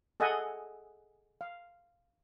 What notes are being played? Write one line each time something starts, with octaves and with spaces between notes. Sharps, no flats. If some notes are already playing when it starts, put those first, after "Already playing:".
G#4 A4 D#5 E5 F#5 G#5
F5